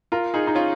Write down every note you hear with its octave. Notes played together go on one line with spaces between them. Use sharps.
F4 A#4
D#4 G#4
D#4
C#4 F4